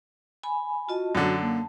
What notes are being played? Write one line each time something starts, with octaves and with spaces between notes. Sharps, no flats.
G#5 B5
F4 F#4 D#5 A5
F#2 D3 A5
A#3